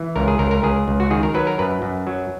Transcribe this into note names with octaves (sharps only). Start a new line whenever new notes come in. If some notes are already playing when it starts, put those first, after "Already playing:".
Already playing: E3
C#2 A#4
G#4
C#2 A#4
A#4
C#2 G#4
C#2
F#4
D#3 G#4
A#4
F#3 B4
A#4
F#2 B4
F#2
F#3